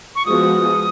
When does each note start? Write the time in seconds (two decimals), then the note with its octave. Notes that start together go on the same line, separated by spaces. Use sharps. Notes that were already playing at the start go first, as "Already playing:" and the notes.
0.15 C#6
0.26 F3 G#3 B3 F#4 D#6